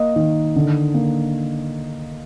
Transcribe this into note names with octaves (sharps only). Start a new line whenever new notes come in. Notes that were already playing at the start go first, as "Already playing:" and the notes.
Already playing: A#3 D#5
D#3
D3
A#3